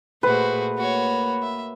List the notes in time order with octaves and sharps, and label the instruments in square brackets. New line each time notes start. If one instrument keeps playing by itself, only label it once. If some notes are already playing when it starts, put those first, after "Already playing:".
[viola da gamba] A#2 A3 G#4 [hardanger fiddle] F#4 C5 [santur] B4
[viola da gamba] A#3 [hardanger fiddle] F#4 C#5
[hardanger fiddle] E5